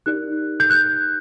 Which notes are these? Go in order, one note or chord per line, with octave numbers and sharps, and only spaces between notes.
D#4 G4 A#4 D5 F#6
G6
F#6